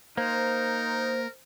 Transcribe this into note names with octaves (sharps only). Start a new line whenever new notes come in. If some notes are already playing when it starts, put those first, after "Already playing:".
A#3 D#4 A#4 C5